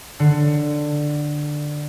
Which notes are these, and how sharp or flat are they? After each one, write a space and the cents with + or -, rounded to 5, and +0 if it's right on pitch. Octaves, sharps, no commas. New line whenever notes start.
D3 +10